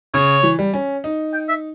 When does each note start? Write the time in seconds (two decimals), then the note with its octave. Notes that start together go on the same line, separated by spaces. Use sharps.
0.14 C#3 C#5
0.43 E3
0.59 G3
0.74 C#4
1.04 D#4
1.33 G5
1.49 E5